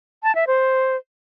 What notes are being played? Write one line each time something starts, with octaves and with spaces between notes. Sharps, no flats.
A5
E5
C5